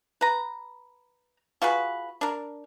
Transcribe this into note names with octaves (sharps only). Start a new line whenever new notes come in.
B4 A#5
F4 F#4 G#4 B4
D4 A#4